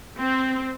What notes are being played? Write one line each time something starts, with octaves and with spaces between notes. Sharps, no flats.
C4